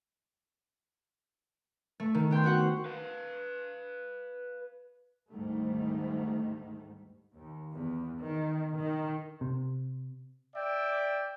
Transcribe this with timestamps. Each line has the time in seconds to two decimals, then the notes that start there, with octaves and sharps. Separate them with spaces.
2.00 A3
2.15 D#3
2.31 B3 G5 C6 G6
2.44 B3 C4 F#4 F#5 G5
2.86 B4 F5
5.29 D2 G#2 D#3 G3 A3
7.35 D#2
7.75 E2
8.24 D#3
8.78 D#3
9.41 C3
10.55 D5 E5 G5